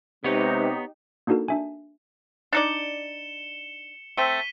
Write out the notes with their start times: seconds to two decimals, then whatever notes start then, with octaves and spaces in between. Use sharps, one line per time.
0.24 C3 G#3 B3 D#4 G4 B4 C#5
1.27 A#3 D4 D#4 F#4 A4 A#4
1.48 D4 E5 G#5
2.53 D4 D#4 D5 C#7 E7 G7
4.17 A3 C4 B6 D#7 G7